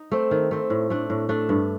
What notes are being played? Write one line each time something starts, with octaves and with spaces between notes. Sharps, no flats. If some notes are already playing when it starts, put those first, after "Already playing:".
Already playing: D#4
A3 C4
D#3
A3 C4
A2
A3 D4
A2
A3 D4
G2